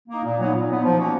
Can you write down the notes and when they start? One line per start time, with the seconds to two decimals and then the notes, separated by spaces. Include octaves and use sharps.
0.08 A#3 D#4
0.23 A#2
0.38 F#3 B3 D#4
0.53 A#2
0.69 F#3 B3 D#4
0.83 F3
0.98 A#3 C#4 F#4